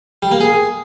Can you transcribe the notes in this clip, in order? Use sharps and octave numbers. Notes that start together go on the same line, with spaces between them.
G3
A#3
G#4